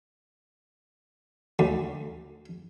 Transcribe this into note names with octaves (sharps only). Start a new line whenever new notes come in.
D2